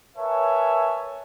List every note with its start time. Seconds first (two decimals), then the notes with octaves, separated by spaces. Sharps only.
0.16 A#4 B4 C#5 E5 G#5 A5